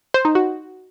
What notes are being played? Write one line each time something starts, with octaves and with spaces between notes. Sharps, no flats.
C5
D#4
F#4